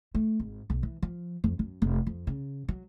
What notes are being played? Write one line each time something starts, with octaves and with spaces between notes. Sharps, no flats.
A3
G#1
B1
E3
F3
F2
F#2
F1
F2
C#3
F#3